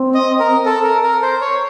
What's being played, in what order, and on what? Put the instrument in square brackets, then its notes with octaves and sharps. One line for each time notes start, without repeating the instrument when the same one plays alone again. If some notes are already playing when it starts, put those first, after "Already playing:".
Already playing: [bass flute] C4
[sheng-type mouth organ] D#5
A#4
A4
A#4
A#4
C5
C#5